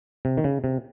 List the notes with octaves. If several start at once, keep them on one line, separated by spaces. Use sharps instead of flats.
C3
D#3
C#3
C3